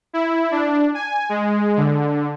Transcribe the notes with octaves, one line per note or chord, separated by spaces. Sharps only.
E4
D4
G#5
G#3
D3